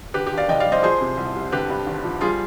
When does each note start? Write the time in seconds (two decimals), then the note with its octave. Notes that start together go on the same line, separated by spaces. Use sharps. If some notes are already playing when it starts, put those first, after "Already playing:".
0.14 D3 G4 B4
0.27 G4
0.32 D#2
0.37 D5 F5
0.48 F1 D#5 G5
0.60 D5 F5
0.66 G3
0.72 C5 D#5
0.83 F3 G#4 C5
1.01 C3
1.17 C2
1.35 C2
1.52 D3 G4 B4
1.70 G2
1.87 G#1
2.04 F3
2.21 G3 F4 G#4